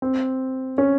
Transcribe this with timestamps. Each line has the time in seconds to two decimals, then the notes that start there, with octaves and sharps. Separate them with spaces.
0.02 C4
0.78 C#4